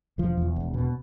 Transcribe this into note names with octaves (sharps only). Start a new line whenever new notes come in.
E1 F3
E2
E1
B2